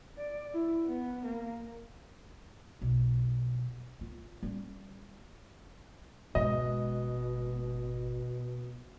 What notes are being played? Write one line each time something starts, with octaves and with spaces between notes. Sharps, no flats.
D5
E4
B3
A#3
B1
F4
G3 C#4
G#1 B2 G#3 D#5